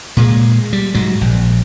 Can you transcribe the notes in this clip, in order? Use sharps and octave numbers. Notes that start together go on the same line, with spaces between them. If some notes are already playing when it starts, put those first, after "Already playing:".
A#2 G#3
G3
G#2 F#3
A#1